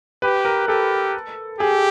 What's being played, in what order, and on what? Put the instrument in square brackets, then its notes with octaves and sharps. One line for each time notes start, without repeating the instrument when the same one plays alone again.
[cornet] G4 [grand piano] B4
[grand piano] A#4
[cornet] G4 [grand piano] A4
[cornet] G4 [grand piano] G#4